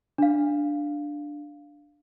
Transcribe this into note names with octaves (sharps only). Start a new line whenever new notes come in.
D4 F5